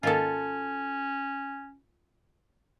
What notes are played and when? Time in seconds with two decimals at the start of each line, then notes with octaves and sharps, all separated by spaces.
0.03 G#2 D#3 A#3 C#4 F4 A4